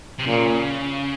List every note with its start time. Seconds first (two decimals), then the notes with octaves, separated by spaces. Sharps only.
0.19 C3
0.26 A#2 C#3